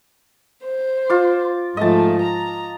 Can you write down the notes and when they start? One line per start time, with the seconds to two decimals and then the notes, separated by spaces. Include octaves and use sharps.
0.65 C5
1.09 F4 D6
1.77 G#2 F3 A3 D#5 A5
2.22 A#5